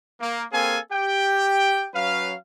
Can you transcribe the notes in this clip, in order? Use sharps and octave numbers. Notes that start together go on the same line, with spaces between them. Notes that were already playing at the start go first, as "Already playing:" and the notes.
A#3
A#3 C4 G#4 A4 F5 G#5
G4 G5
F#3 C#4 B4 F5